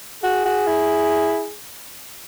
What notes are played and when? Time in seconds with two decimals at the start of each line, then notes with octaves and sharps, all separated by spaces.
0.23 F#4 G#4
0.45 F#4
0.67 E4